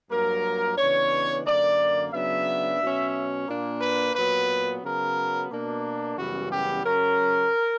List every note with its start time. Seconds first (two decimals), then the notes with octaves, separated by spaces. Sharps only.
0.11 G2 F#3 A#3 A#4
0.78 C#3 E3 B3 D4 C#5
1.45 F#2 D3 A#3 D5
2.13 C#3 F#3 B3 D4 E5
2.80 B2 F#3 C#4
3.48 A#2 A#3 D4
3.81 B4
4.15 A#2 F#3 B3 B4
4.82 C#3 F#3 B3 A#4
5.50 B2 A#3 D4
6.17 F#2 C#3 E3 G3 B3 F#4
6.50 G4
6.84 C#3 F#3 C#4 A#4